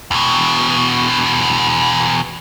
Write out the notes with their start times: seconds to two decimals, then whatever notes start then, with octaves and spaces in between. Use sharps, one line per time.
0.11 E2 B2